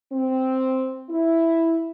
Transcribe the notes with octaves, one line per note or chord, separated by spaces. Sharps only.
C4
E4